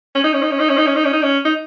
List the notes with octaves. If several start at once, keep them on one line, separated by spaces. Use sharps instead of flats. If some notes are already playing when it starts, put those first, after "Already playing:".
C#4
D#4
C#4
D#4
C#4
D#4
C#4
D#4
C#4
D#4
C#4
D#4
C#4
D#4